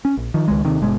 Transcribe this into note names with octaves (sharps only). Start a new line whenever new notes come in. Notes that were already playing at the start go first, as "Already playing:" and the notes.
C#4
A#1
D#3 F3
C#2 D#3 G#3
D#2 C3 D#3
G1 B2 G#3